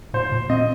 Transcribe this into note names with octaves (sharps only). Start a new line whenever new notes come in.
A#2 C5
A#2
C4 D#5